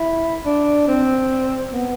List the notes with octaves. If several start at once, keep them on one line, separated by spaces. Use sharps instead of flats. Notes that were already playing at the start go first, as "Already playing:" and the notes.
Already playing: E4
D4
C4
B3